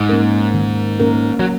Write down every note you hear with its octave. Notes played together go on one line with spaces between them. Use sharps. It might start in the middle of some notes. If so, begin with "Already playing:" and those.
Already playing: G#2
A#3 C#4 A#4
D#3
A#3 C#4 A#4
F#3